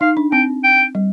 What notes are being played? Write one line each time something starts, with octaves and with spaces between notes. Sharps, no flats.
D#4 F5
D4
C4 G5
G5
G3